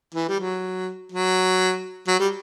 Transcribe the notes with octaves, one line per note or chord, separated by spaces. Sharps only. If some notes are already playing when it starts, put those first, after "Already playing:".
E3
G3
F#3
F#3
F#3
G3